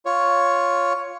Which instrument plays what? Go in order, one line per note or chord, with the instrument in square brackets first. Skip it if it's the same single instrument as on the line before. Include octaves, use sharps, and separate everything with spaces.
[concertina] F4 C#5